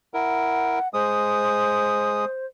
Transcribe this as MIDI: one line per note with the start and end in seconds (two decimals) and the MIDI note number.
0.14 0.79 64
0.14 0.79 70
0.14 0.88 78
0.94 2.25 56
0.94 2.46 72
0.94 2.25 87